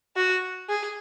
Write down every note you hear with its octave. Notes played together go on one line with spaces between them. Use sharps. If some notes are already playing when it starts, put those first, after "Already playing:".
F#4
G#4